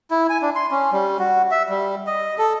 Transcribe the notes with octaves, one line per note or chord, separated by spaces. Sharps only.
E4
G#5
D4
C6
C#4
G3
F#4
E5
G3
D#5
A4